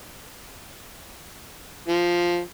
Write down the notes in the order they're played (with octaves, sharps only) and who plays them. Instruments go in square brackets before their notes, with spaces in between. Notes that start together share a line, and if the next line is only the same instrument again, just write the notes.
[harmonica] F3